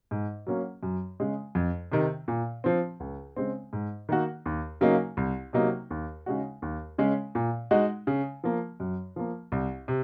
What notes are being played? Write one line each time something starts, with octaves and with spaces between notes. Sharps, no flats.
G#2
F#3 A#3 C#4 F#4
F#2
C#3 G#3
F2
C3 D#3
A#2
F3 C4
C#2
C#3 G#3 C4
G#2
D#3 A#3 D#4 F#4
D#2
C#3 F#3 A#3 D#4
C2
C3 F#3 A#3 D#4
D#2
C#3 G#3 D#4 F#4
D#2
C#3 G#3 C#4
A#2
G#3 D#4 F#4
C#3
F3 A#3
F#2
F3 A#3
C2
C3